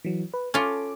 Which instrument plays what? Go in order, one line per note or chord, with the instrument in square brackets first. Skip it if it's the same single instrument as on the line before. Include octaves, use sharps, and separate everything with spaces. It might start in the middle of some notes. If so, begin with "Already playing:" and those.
[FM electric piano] E3 F#3
B4
[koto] C#4 F4 [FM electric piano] A4 D6